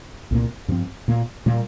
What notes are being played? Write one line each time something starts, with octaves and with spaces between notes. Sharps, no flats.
C2 A#2 A#3
G2 F3 C4
A#2 A#3
A#2 G3 A#3